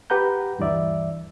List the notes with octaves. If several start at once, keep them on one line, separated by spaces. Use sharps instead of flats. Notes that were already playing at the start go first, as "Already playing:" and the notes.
G4 B4 F#5 A#5 G6
D2 G2 E3 D5 E5